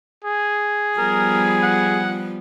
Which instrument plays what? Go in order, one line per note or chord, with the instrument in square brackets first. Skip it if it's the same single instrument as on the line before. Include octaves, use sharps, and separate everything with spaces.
[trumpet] G#4
[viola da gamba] F3 G3 B3 [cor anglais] A#4
[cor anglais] F#5